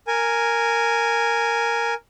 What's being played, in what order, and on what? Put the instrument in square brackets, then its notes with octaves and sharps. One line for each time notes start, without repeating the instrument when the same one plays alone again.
[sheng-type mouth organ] A#4 G#5